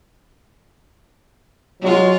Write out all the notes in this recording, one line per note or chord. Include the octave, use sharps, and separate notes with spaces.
F#3 G#3 F4